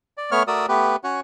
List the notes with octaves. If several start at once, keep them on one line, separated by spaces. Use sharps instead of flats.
D5
A3 B3 C#5 F6
A3 F#4 A#4 D5 D#6 E6
A3 B3 G4 B4
C#4 F#4 C#5 F#5